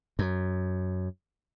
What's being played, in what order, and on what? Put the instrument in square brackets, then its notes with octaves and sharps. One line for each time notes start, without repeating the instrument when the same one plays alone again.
[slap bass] F#2